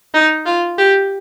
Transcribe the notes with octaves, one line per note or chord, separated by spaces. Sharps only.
D#4
F4
G4